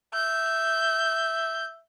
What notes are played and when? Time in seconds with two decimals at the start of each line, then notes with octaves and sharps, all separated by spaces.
0.14 E5 G6